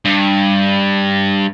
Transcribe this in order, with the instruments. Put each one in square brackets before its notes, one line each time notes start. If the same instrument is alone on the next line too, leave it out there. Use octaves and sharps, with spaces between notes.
[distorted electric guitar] G2